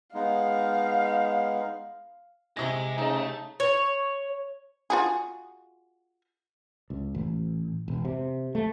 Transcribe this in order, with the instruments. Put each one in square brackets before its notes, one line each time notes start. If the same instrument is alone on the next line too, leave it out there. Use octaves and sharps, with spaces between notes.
[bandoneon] G#3 B3 D#4 [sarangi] F5
[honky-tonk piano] C3 E4 A#6 [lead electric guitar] G#3
[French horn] C#3 [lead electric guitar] A3 [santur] D#4
[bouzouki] C#5
[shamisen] F4 F#4 G#4
[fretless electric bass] C#2
A1
E1
C3
A3